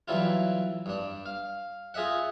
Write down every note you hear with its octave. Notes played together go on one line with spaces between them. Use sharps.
E3 F#3 G3 E4 F4
G2 D4
F5
F4 G#4 D#5 E5 F#5